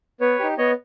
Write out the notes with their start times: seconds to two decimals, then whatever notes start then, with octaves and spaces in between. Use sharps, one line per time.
0.20 B3 B4 C#5
0.39 D#4 G4
0.58 B3 C#5 D#5